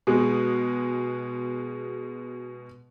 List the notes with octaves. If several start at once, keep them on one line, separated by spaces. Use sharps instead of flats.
B2 G#3